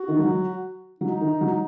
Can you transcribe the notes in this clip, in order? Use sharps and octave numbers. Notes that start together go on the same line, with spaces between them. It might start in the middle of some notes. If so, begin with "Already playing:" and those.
Already playing: F#4
D#3
F#3
F#3 D#4
D#3
F#3